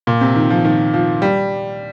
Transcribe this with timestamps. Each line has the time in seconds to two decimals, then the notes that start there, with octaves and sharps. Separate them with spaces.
0.07 A#2
0.21 C3
0.36 D#3
0.50 F3
0.65 D#3
0.94 F3
1.22 G3